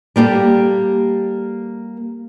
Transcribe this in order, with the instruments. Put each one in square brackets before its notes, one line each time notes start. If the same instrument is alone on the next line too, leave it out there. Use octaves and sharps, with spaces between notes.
[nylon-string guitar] G3 A#3 G4 A4